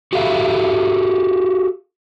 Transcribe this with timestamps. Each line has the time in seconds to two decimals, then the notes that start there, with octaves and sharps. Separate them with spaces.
0.13 F#4 G4 A4 E5 F5